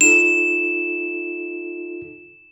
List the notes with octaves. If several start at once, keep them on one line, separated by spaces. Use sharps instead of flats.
D#4 F4 A4 E7